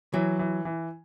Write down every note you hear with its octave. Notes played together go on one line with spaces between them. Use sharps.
E3 F#3
E3
E3